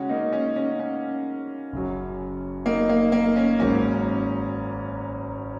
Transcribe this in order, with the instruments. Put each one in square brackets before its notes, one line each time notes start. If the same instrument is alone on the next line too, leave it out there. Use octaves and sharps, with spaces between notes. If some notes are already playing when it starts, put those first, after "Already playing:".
Already playing: [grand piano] C#3 G#3 F#4 [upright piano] C#4
[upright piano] A#3 D#4
C#4
C#4
C#4
[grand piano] F#1 F#2 F#3
[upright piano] A#3 D#4
A#3
A#3
C#4
[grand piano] G#1 G#2 F#3 A#3 [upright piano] C#4